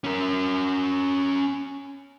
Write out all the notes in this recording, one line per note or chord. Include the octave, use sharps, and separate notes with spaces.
C#4 A#4